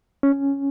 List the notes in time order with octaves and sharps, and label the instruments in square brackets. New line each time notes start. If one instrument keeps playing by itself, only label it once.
[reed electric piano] C#4